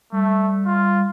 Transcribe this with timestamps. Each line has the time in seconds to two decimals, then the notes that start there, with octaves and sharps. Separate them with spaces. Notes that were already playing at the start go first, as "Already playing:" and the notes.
0.12 G3 A3
0.66 F4